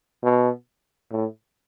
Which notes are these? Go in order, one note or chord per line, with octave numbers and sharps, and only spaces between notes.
B2
A2